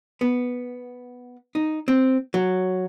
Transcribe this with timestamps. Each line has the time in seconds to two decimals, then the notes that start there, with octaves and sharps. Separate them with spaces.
0.21 B3
1.55 D#4
1.88 C4
2.34 F#3